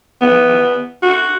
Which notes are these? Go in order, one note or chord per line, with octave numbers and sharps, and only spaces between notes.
B3
F#4